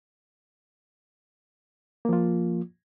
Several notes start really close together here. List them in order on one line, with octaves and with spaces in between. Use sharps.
A#3 F3 F4